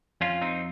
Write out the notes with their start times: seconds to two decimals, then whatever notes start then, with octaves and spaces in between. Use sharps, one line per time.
0.21 F2 C#4 F4
0.41 C4 D#4